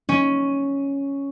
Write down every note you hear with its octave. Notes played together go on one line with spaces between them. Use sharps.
C#4